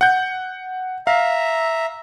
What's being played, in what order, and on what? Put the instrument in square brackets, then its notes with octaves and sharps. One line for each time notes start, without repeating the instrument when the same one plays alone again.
[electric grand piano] F#5 G6
[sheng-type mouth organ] E5 A#5 [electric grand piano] F5